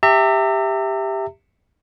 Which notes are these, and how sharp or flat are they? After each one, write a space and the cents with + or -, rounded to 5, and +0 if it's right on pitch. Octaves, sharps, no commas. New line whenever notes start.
G4 +10 E5 +0 A#5 -45